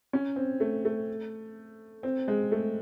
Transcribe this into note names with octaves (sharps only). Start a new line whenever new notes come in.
C#4
C4
A3
A3
C4
G#3
A3